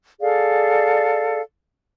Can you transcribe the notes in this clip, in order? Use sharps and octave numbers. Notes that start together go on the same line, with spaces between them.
G#4 A4 D5 F5